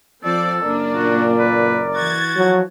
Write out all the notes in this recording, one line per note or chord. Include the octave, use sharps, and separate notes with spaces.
F3 C4 A4 D5
F#1 A#3 D4 A#4 D5
A#2 F#4
B4
E3 F#4 G#6 A6
F3 F#3